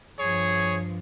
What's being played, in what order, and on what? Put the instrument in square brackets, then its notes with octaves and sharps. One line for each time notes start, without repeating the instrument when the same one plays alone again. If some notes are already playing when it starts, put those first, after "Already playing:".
[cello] G2 F3 [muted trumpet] G#4 [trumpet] C#5